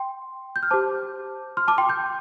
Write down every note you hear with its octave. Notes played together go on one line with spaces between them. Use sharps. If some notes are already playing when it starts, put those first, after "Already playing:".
Already playing: G5 C6
G6
F6
G4 C5 A5 D6
C6 F6
A5 D6
G5 C6
D6 G6